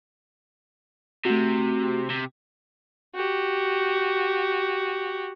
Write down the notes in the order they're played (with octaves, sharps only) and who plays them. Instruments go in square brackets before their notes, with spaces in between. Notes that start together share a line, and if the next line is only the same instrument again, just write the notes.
[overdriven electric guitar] C3 [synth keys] A3 F#4
[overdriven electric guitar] C3
[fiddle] F#4 G4